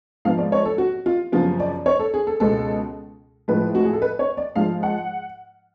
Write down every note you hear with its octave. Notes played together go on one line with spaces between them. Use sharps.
G#2 F3 B3 F5
D5
C#5
A4
F#4
F4
F#2 C#3 F3 B3 F4
D5
C#5
A4
G#4
A4
C#2 B2 G#3 B3 A4
A2 F3 G#3 B4
F#4
G#4
A4
B4
C#5
D5
G#2 F3 G#3 F5
F#5